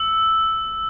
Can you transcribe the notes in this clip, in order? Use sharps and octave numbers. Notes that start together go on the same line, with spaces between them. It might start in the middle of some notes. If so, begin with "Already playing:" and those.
Already playing: E6